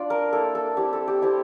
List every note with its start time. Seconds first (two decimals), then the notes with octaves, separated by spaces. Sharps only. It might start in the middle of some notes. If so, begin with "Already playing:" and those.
Already playing: D4 F4 D5
0.10 A#4
0.33 A#3 E4 A4
0.55 A4
0.77 A3 C4 E4 G4
0.93 A4
1.08 G4
1.22 A3 C4 E4 G4